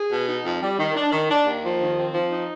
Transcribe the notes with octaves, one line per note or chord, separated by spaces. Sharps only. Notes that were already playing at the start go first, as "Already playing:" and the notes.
Already playing: G#4
B2
D#4
F2
G3
D#3
D4
D#3
D4
D#2
F3
D#3
C4
F3
D#4